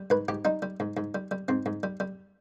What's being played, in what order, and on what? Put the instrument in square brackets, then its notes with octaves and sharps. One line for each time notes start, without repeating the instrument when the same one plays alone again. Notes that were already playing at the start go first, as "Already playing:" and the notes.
Already playing: [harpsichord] G3
G#2 B4
G#2 G4
G3 D#4
G3
G#2
G#2
G3
G3
G#2 C4
G#2
G3
G3